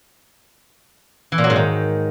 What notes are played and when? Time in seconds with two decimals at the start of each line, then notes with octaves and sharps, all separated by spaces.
1.32 E3
1.38 A#2
1.44 F#3
1.50 G#2
1.56 D#3